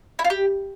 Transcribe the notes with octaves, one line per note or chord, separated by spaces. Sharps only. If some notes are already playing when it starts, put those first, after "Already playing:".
E4
F4
G4